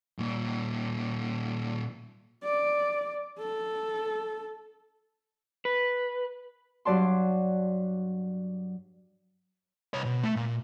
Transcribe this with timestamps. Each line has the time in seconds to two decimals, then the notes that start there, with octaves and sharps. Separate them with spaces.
0.19 A#2 G3
2.44 D5
3.38 A4
5.65 B4
6.85 G2 F#3 D5 A5 C6
9.94 C2 C#5
10.06 B2
10.23 A3
10.36 A#2